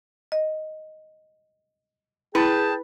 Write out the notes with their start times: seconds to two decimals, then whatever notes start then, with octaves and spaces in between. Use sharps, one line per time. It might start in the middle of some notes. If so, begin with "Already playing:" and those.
0.32 D#5
2.35 E4 G#4 B4 G5 A5